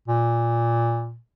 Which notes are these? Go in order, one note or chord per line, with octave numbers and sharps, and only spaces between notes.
A#2